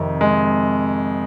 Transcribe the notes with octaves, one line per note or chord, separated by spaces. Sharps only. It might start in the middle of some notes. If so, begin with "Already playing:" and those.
Already playing: F2 C3 D#3
G#3